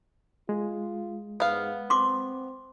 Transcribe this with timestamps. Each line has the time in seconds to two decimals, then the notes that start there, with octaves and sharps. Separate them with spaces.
0.49 G#3 F4
1.40 G#2 B3 F5
1.90 C4 C6 D6